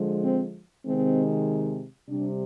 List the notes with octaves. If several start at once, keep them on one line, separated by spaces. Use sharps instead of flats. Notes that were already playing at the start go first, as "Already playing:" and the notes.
Already playing: D3 F3 G#3
C4
C3 D#3 G#3 C4
C3 G3 D4